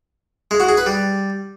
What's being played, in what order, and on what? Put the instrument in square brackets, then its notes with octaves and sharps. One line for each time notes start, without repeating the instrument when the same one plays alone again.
[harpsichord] G#3
F#4
G#4
B4
G3